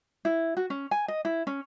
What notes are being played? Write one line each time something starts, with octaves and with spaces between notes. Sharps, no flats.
E4
F#4
C#4
G#5
D#5
E4
C#4